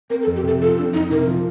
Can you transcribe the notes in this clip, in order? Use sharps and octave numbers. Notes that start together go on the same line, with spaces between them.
C4 A#4
A4
F2
G4
C3 A4
F3 A4
C4 D4
F2 D#4
C3 A#4
F3